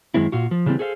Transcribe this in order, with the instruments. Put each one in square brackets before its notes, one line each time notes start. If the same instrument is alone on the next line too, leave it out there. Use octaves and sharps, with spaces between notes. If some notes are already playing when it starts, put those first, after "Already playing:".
[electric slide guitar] F#2 D#3 G#3 C4 E4
A#2 F4 F#4
F3
C#3 E3 G3 A#3 C4
G#4 A4 C5 E5 F5